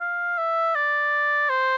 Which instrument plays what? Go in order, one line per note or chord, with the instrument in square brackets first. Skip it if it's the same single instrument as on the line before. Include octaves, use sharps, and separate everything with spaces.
[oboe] F5
E5
D5
C5